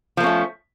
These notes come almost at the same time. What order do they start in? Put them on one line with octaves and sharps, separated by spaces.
F3 A#3 C#4 A3